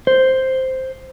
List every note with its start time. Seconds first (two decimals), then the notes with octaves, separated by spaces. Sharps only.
0.07 C5